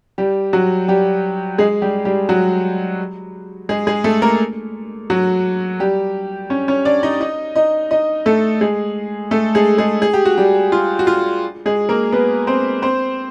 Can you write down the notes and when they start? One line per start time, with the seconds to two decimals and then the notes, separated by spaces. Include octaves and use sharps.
0.18 G3 G4
0.53 F#3 F#4
0.88 G3 G4
1.58 G#3 G#4
1.82 G3 G4
2.05 G3 G4
2.29 F#3 F#4
3.69 G#3 G#4
3.87 G#3 G#4
4.04 A3 A4
4.22 A#3 A#4
5.10 F#3 F#4
5.80 G3 G4
6.50 C#4 C#5
6.68 C#4 C#5
6.85 D4 D5
7.03 D#4 D#5
7.21 D#4 D#5
7.56 D#4 D#5
7.91 D#4 D#5
8.26 A3 A4
8.61 G#3 G#4
9.31 A3 A4
9.55 G#3 G#4
9.78 G#3 G#4
10.02 G#4
10.14 G4
10.26 F#4
10.38 G3 G4
10.72 F4
10.99 F#4
11.07 F4
11.66 G#3 G#4
11.89 A#3 A#4
12.12 B3 B4
12.47 C4 C5
12.82 C4 C5